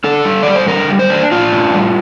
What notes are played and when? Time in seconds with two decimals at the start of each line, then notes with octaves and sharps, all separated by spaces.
0.04 D4 A4
0.25 G3
0.43 G3 D5
0.55 C5
0.67 D3 A#4
0.89 G3
0.99 C5
1.10 D4
1.31 D4 F4
1.53 A2
1.74 G3